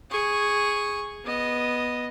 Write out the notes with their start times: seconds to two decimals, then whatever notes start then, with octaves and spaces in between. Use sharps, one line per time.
0.11 G#4 C#6
1.25 B3 D#5